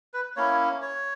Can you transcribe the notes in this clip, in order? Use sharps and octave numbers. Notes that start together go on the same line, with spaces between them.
B4
A#3 C#4 E4 C#5
C#5